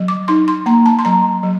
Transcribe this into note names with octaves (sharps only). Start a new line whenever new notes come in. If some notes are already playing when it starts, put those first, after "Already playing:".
Already playing: F#3
D6
D#4 C6
C6
A#3 A#5
A5
C6
F#3 A#5
F#3